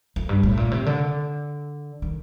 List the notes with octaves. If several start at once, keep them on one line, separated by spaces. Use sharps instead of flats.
F2
G2
A2
A#2
C3
D3
D#3